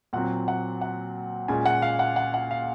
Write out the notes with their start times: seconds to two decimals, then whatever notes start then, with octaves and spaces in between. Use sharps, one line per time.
0.13 A#2 F#3 C4 F#5
0.48 F#5
0.81 F#5
1.48 A#2 G#3 C#4 G#5
1.66 F#5
1.82 F5
1.99 F#5
2.16 F#5
2.34 F#5
2.51 F5